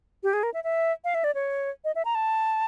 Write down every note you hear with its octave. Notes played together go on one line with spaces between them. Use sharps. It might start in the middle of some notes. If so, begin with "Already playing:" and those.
G4
G#4
A#4
E5
E5
F5
E5
D5
C#5
D#5
E5
A#5
A5